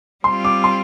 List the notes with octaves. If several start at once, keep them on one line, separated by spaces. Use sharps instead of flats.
G3 C4 F4 C6
D6
C6